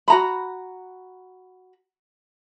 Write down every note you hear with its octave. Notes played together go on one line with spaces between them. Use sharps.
F#4 A#5 B5